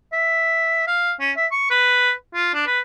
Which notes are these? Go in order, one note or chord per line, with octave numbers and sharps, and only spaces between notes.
E5
F5
C#4
E5
C#6
B4
F4
D4
B4